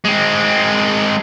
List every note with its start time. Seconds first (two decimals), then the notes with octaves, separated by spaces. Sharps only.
0.04 G#3 C4